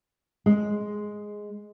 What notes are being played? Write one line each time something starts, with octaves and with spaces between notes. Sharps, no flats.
G#3